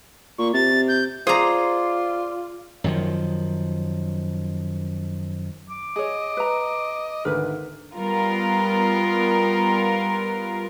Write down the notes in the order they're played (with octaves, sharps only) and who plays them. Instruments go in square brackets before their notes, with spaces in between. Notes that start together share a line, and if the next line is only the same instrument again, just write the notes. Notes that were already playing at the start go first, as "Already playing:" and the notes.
[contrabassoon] A#2 [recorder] C#6
[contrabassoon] C3 [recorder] A6
[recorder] G6
[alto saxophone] F4 [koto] G#4 A#5 [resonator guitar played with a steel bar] C5 [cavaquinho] D5 D#6
[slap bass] F#2 D#3 F3
[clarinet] D6
[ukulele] G#4 C#5 [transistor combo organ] D#5
[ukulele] B4 A#5
[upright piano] G#1 D2 [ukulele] A#4 B4
[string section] G3 B3 F4 A#4